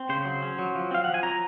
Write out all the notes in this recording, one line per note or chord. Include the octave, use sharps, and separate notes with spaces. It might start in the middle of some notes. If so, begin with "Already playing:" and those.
Already playing: C4
C#3 C5
F#3
C#4
F#3
F3
C4 F5
F3 F#5
G#5
F#3 A#5